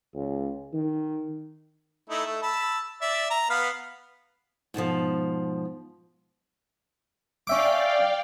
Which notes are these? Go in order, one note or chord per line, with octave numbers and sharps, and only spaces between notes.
C#2
D#3
A3 D#4 E4
A3
A5 B5 E6
D5 E5
A#5
B3 F5 B5
G#2 B2 D3 F3
C#4 D5 E5 F5 G5 D6